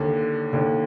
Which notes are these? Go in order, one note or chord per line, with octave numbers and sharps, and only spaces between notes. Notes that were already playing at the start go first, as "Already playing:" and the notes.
Already playing: D#2 D3
D#2 D3